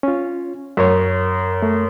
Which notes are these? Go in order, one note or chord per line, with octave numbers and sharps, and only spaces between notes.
C#4 F4
F#2 A#4 C#5
A3